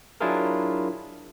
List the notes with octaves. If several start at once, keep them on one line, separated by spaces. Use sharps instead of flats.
F#3 D4 E4 F4 G#4 A#4